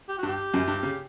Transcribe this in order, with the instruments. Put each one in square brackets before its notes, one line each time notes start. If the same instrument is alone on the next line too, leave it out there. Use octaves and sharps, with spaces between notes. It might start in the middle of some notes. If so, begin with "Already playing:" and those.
[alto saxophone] G4
[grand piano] G2 [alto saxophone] F#4
[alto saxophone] G4
[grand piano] F#2
G2
C#3